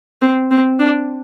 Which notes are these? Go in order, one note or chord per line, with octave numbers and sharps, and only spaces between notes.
C4
C4
D4